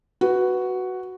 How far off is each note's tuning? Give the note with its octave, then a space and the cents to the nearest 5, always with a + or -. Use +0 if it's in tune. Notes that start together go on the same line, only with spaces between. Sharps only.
F#4 +5 B4 +0